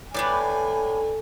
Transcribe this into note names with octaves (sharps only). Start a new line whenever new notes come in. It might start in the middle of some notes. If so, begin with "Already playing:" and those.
A2 D4 B4 D5 G#5